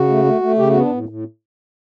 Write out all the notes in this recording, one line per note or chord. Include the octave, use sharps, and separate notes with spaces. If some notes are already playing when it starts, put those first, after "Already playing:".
Already playing: C#3 F#4
A3
A3
A3
C#3 G4
F#4
B3
D4
A2
A2